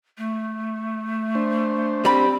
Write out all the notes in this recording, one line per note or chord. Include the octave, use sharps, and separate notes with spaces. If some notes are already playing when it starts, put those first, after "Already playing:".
A3
D4 C5
G3 C4 B5